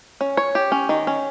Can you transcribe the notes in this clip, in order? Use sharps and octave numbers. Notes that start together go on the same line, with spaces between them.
C#4
C#5
G4
C#4
D#3
C#4